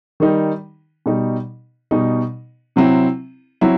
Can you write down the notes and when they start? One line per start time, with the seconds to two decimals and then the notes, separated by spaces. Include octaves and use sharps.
0.20 D#3 G3 D#4
1.06 B2 G3 D#4
1.91 B2 G3 D#4
2.76 C3 F#3 C4 E4
3.61 F#3 C4 E4